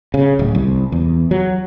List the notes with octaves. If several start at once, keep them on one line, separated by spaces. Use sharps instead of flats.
C#3
D1
C2
E2
F#3